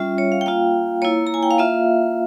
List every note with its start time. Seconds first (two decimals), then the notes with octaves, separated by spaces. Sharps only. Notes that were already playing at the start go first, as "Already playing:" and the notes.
Already playing: G3 C#4 F4 E5
0.18 C#5
0.32 F5
0.41 G5
0.46 A#3 F4 F5
1.02 A#3 E4 C#5
1.27 A#5
1.34 G#5
1.43 G5
1.51 F5
1.58 A#3 F4 E5